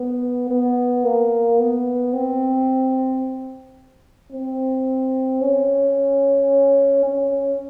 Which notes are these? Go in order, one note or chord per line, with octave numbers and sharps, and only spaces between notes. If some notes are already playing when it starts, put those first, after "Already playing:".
Already playing: B3
B3
A#3
B3
C4
C4
C#4
C#4